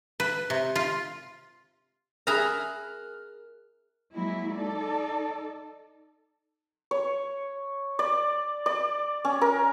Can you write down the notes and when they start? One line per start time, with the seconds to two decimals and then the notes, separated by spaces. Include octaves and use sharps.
0.20 B4
0.50 C3
0.76 F4
2.27 G#4 A#4 E5 A#5 F6 F#6
4.13 F#3 G#3 A#3 E4
4.55 D#4 A4 D5
6.91 C#5
7.99 D5
8.66 D5
9.25 C#4
9.41 A#4